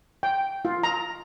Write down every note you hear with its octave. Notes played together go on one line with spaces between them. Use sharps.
G5
F4
A#5